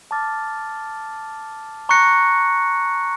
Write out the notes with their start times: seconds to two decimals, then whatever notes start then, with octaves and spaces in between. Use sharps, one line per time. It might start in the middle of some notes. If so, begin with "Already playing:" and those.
0.11 A5 D6 F6 A6
1.89 A#5 C#6 F#6 A#6 C#7